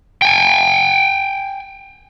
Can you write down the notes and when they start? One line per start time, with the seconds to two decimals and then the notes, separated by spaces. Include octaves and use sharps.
0.22 G5 G#5